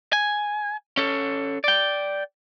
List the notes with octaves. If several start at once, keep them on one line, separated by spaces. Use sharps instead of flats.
G#5
C#4 A4
D5 G5